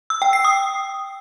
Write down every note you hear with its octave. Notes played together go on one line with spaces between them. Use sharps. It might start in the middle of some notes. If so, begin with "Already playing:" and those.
E6
G5
C7
D#6